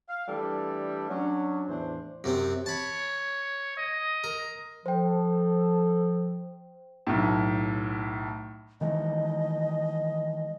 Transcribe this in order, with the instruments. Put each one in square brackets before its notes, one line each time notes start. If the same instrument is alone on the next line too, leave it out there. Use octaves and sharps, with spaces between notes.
[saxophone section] F5
E3 G3 A3 D4 G4 A4
F#3 C#4 D4
E2 A2 E3 D4 C5
[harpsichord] F#2 C3 C4
[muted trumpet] C#5 [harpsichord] A5 B5
[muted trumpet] D#5
[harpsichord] A#4
[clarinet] F3 [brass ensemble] A4 [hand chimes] C5 G5
[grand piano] B1 A2
[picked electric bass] D#3 E3 G#3 [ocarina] D#5